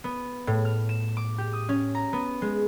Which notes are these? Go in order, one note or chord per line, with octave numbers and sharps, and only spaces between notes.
B3
A2
F6
E7
D6
G4
D#6
C#4
A#5
B3
G#3